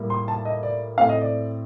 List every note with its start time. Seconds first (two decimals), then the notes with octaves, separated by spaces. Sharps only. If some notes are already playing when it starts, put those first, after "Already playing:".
Already playing: A2 G3 A#3
0.10 C6
0.28 A5
0.45 D#5
0.63 D5
0.98 A2 A3 C4 F5
1.09 D#5
1.21 D5